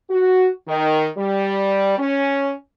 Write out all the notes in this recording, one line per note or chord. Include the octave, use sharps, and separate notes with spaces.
F#4
D#3
G3
C#4